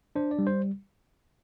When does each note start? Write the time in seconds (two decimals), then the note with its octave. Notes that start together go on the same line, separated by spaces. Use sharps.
0.16 D4 C5
0.31 D5
0.39 G3
0.47 C5